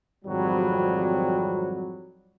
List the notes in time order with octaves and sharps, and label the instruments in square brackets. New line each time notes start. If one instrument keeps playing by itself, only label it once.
[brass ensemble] G#1 F2 F#3 G3